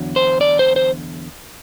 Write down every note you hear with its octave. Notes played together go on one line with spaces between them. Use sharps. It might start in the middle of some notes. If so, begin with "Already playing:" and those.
Already playing: E2 D3 F#3
C5
D5
C5
C5